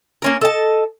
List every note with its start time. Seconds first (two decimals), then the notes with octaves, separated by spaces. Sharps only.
0.22 A#3 C#4 A#4
0.41 A4 D#5 A5